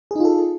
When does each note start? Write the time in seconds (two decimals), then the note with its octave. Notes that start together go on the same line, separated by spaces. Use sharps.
0.11 G#4
0.16 D#4
0.20 F4
0.25 A4